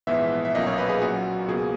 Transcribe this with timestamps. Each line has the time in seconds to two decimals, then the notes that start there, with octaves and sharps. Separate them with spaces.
0.07 A#1 G#2 E3 B3 E5
0.45 E5
0.55 B1 A#2 A#3 C#4 D#5
0.67 C#5
0.78 B4
0.89 G#4
1.01 A#2 F#3 C#4 F#4
1.48 C#2 B2 A#3 G#4